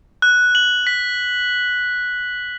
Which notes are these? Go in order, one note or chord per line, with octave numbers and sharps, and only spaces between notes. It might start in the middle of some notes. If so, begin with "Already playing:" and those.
F#6
F#7
B6